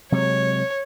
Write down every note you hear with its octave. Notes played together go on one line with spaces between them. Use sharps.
C3 F#3 G#3 C#5